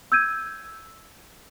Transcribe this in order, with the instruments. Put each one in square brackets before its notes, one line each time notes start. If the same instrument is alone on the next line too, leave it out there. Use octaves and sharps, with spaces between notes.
[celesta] E6 G6 G#6 D#7